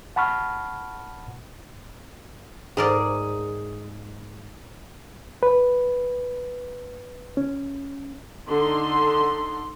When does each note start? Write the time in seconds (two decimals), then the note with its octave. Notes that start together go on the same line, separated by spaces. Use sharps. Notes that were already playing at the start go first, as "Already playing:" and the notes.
0.16 F#5 A5 B5 C#6 F6
2.77 G#2 G#4 A#4 D5
5.43 B4
7.37 C#4
8.48 D3 D#4 C6